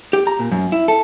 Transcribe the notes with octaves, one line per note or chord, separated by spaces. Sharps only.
G4
A#5
A#2
F#2
E4
A4